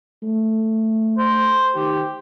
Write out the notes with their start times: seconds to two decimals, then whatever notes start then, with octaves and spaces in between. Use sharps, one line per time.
0.23 A3
1.18 C5
1.75 D#3 G4